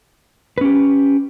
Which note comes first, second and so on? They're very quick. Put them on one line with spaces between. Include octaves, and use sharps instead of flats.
B4 C#4 G4